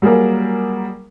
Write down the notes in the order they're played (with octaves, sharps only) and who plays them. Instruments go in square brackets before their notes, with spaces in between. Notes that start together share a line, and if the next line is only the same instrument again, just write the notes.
[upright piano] F#3 G3 A#3 G#4 A#4